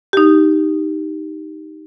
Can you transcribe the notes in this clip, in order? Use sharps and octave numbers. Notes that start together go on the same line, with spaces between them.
D#4 G4